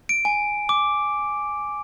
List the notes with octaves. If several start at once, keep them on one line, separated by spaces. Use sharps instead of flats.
D7
G#5
D6